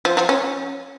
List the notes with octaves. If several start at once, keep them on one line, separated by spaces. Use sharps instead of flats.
F3
F3
C#4